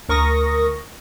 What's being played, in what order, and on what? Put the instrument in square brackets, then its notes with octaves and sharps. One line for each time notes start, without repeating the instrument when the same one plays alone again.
[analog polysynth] D2 A#4 C#6 D#6 A#6